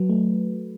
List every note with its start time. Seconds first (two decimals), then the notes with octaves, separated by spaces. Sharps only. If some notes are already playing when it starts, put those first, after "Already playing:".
Already playing: F#3 B4
0.09 A3